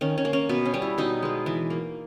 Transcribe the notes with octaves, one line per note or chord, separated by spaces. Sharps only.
D#3 C#4
C#4
A#3
C#4
B2 B3
C#4
G3 B3
E4
B2 D#4
G#3 B3
E3
A#3